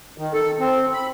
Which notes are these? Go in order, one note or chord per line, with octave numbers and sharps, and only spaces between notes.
D#3
A4
C4
B5